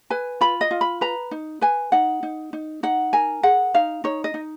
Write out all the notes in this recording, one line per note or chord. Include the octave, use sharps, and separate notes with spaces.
B4 G#5
F4 B5
D#5
F4
B5
B4 A#5
D#4
B4 G#5
D#4 F#5
D#4
D#4
D#4 F#5
A#4 G#5
G#4 F#5
D#4 F5
D#4 C#5
D#5
D#4